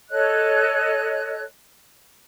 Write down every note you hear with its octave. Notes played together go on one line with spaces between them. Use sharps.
A4 C#5 D#5 F#6